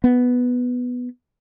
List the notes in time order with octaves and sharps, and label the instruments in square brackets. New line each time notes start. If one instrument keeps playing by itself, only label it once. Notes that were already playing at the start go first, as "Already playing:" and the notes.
[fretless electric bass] B3